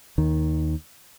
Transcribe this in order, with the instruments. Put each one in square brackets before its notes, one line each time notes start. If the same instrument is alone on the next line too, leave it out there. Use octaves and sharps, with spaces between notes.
[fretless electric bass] D#2 D#3